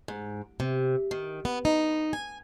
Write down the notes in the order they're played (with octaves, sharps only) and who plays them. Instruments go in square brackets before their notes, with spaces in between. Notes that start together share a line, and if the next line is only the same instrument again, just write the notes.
[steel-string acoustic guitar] G#2
C3
D#3
B3
D#4
G#5